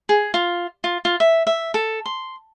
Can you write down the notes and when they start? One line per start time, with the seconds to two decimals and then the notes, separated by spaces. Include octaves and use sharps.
0.09 G#4
0.34 F4
0.84 F4
1.05 F4
1.20 E5
1.47 E5
1.74 A4
2.06 C6